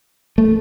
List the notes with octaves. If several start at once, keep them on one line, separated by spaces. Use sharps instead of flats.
A3